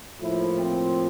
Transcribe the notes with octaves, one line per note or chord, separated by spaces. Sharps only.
A2 F3 A#3 E4
C4